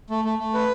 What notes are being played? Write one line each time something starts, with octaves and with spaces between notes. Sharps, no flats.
A3
A3
A3
B4